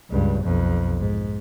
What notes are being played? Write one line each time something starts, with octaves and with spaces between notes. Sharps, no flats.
C#2 G2
B1 F2
G#2